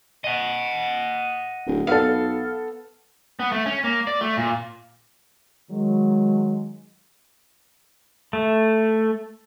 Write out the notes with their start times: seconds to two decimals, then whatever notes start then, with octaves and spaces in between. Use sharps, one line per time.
0.24 D#5 F#5
1.67 D1
1.87 B1 B3 A4 F5
3.40 B3
3.52 A3
3.66 C#4
3.84 A#3
4.07 D5
4.21 A3
4.37 A#2
5.70 D#3 F#3 G#3
8.33 A3